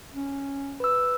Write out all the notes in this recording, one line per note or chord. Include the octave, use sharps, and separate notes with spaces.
C#4
B4 E6